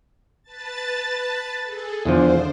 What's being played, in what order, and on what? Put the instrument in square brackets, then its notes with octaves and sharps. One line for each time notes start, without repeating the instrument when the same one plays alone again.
[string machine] B4 A5 A6
G#4 A4
[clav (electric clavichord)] E2 D3 F3 [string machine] D4 C5